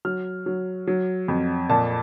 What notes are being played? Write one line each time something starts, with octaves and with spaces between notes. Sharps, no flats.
F#3 F6
F#3
F#3
F2
A#2 A5